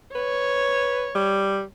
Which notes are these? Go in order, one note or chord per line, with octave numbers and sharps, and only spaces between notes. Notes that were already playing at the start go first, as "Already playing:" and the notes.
B4 C#5
G3